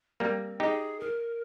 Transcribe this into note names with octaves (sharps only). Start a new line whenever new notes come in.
G3 A#3 C4
D#4 G4 G#4
A#4